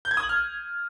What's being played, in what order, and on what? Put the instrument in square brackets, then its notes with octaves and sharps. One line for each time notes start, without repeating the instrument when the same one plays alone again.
[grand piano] G6
G#6
D#6
F#7
F6